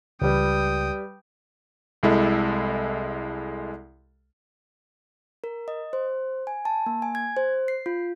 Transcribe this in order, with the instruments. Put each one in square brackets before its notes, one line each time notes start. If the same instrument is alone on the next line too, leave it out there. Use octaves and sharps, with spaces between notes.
[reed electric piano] C#2 [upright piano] G3 B4 [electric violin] G5 D#6
[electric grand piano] C2 G#3 E4 A4
[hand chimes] A#4
D#5
C5
G#5
A5
A#3
G#5
G#6
C5
C7
F4